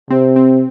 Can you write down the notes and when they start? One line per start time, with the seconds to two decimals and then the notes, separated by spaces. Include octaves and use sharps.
0.10 C3 C4
0.36 C4